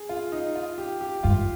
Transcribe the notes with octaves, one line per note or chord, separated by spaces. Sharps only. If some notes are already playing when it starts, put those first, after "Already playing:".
Already playing: G#4
F4
D#4
F4
G4
G4
G2 F4